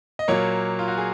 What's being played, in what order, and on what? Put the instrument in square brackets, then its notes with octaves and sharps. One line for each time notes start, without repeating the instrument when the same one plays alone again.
[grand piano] D#5
A#2 F#3 A#3 C#5
F4
F#4
G#4